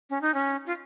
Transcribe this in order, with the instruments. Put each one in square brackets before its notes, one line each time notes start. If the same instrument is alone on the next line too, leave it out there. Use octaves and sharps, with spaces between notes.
[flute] C#4
D#4
C#4
F4